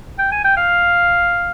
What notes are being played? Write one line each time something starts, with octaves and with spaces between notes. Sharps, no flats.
G5
G#5
G5
F5